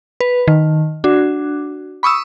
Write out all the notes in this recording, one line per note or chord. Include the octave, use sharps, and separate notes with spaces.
B4
D#3
D4 F#4
B5 C#6 D#6 E6